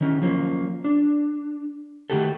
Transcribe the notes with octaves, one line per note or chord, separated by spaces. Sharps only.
D#3 E3 C#4
F3 F#3 A#3 C#4
D4
D#3 F#3 A3 F#4 G4 A4